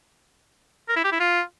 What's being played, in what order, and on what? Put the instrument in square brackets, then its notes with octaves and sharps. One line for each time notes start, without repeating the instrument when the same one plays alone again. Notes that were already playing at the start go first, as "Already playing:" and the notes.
[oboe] A#4
E4
G4
E4
F4